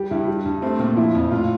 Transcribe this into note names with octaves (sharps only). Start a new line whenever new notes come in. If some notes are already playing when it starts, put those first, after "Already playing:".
Already playing: G3 G4
G2 E4
G3
G2
A3 C4
A#2 C4
F3 E4
F2
A2 F4